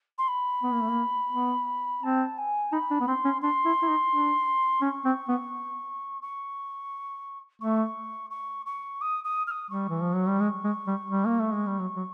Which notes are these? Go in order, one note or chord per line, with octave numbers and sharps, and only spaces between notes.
C6
B5
B3
A#3
A3
A#3
B3
C4 A5
G#5
D#4 B5
D4
B3
C4 C6
C#4
D4 C6
E4
E4
D#4
D4
C#4 C#6
C4
B3
C#6
A3 C#6
C#6
C#6
D#6
D#6
F6
D#6
G3 C#6
E3
F3
F#3
G3
G#3
G#3
G3
G3
A#3
A3
G#3
G3
F#3
F#3